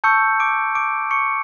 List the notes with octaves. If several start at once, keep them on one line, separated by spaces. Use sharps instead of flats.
A5 C#6 E6 G6 C#7
D6 D7
D6 D7
C#6 C#7